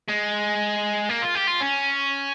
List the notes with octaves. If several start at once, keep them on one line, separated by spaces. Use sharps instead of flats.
G#3
A#3
F4
G4
F4
C#4